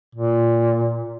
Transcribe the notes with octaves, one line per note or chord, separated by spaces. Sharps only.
A#2